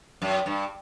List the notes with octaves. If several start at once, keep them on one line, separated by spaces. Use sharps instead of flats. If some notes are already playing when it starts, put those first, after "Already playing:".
F#2
G2